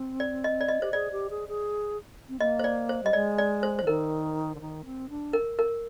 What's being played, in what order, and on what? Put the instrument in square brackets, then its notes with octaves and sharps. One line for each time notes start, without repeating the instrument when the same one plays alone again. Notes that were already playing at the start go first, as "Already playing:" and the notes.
Already playing: [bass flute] C4
[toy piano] D5
D#5
D5
D#5
[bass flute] G4 [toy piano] C5
[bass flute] G#4 [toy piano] D5
[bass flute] G4
G#4
G#4
C4
[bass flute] A#3 [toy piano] D#5
[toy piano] C5
D5
C5
[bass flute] G3 [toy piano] D#5
[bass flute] G#3 [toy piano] D5
[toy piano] D5
C5
C5
[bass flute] F3
[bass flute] D#3 [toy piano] A#4
[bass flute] D3
D#3
C4
D4
[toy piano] A#4
A#4